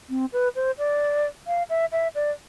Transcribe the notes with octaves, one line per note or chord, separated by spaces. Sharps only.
C4
B4
C5
D5
F5
E5
E5
D5